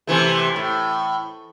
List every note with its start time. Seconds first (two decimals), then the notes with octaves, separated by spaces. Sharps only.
0.07 C3 E3 A3
0.56 A2